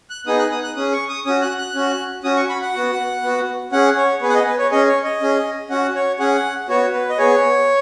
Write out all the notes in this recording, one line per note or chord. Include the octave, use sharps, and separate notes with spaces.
F#6
B3 D#4 G#4 D#6
F#6
D#6
F#6
C#4 G#4 D#6
C#6
D#6
C#4 F#4 D#6
F#6
F#6
C#4 F#4
C#4 F#4 D#6
C#6
B5
F#5
B3 F#4
B3 F#4
C#4 G#4 F#5
C#5
B3 G#4 B4
F#5
D#5
B4
C#5
C#4 G#4 D#5
C#5
D#5
C#4 G#4
C#4 F#4 F#5
C#5
C#4 G#4 F#5
B3 F#4 C#5
B4
D#5
B3 G#4 C#5